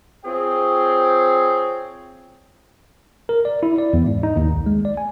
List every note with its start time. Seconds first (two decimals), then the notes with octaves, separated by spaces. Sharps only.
0.25 C4 F4 G#4 C#5 G5
3.29 A#4
3.45 D5
3.63 E4
3.78 D5
3.93 E2
4.06 G#2
4.23 D#4
4.36 D#2
4.55 B1
4.66 G#3
4.85 D5
4.97 G#5